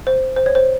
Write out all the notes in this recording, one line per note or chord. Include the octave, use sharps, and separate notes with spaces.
C5
C5
C#5
C5